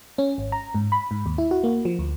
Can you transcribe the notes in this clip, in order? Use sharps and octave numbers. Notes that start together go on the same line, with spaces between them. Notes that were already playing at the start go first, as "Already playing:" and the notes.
C#4
G#1
A#5
G#2
B5
G#2
D#2
E4
F#4
A#3
F3
D2